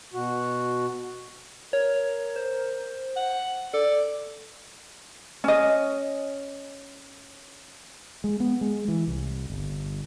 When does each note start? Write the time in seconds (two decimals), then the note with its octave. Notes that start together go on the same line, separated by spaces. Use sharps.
0.14 B2 F#4
1.73 A#4 C#5
2.36 C5
3.16 F#5
3.74 A4 D5
5.44 C#4 D#5
8.24 G#3
8.40 B3
8.61 G#3
8.88 E3
9.07 C2
9.50 G1